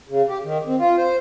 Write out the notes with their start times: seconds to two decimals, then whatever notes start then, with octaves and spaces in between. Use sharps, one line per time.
0.09 C#3
0.28 G4
0.44 D#3
0.66 C4
0.79 F4
0.98 C5